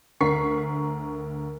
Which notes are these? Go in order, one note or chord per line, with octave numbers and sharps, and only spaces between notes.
D2 A#4 C#6 B6 C7